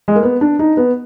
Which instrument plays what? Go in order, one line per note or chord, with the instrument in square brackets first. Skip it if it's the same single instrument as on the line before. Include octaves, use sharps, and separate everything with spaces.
[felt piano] G#3
A#3
B3
D4
D#4
B3